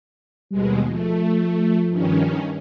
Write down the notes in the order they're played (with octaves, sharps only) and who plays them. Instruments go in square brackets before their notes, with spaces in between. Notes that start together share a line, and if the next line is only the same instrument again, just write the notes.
[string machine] D#2 B2 G#3 [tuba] G3
[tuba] F3 [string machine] A3
[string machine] G2 D#3 C#4